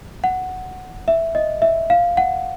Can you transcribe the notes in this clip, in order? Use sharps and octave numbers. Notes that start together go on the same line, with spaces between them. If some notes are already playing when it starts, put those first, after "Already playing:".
F#5
E5
D#5
E5
F5
F#5